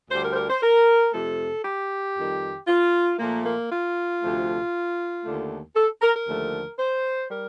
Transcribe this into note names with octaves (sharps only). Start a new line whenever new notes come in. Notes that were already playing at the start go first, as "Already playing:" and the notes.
D2 D3 G3 C5
A#4
C5
A#4
C5
A#4
F2 C3 F3 A3 A4
G4
F2 D#3 G3
F4
A#2 F3 A3 A#3
A#3
F4
D2 C3 F3 A3
D#2 D3 A3
A4
A#4
A#4
D#2 D3 F3 A3
C5
G3 A#4